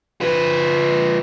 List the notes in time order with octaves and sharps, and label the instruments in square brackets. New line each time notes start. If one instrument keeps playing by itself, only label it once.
[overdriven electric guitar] F3 B4